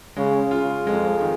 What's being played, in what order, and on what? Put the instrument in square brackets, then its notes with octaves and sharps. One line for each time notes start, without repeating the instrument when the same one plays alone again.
[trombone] C#3 [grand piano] G#3
[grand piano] F4
[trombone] F2 [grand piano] G#3
[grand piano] D#3